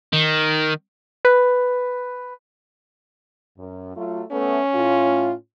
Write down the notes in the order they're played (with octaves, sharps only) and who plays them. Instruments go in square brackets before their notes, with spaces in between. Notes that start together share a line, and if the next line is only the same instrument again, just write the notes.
[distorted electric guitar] D#3
[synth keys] B4
[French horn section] F#2
F#3 A3 F4
[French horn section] A3 B3 [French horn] C#4
[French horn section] A2 F4